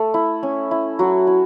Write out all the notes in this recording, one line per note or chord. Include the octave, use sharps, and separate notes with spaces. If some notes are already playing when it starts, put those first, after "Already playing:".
Already playing: A3 A4
E4
C#4
E4
F#3 F#4
E4